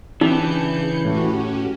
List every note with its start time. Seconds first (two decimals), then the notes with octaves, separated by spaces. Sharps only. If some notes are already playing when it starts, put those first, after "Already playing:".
0.21 C#3 E3 D4 D#4 G4 G6 C#7
1.05 A2 A3 C#4 F#4 G4